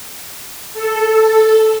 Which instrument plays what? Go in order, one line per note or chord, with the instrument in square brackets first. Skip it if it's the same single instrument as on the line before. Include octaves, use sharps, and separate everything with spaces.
[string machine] A4